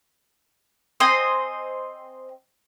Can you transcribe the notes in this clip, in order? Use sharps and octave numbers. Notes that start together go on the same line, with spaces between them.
C4 C5 D#5 G#5